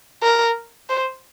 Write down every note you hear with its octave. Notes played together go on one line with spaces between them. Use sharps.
A#4
C5